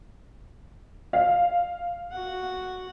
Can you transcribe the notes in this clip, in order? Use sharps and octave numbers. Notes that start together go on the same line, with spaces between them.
F5
F#4 F#5